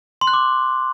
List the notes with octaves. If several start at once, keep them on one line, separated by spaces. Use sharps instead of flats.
C6
F#6
D6